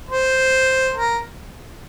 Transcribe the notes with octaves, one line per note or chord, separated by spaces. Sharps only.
C5
A#4